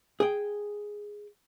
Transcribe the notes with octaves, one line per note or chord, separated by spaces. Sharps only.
G#4 G5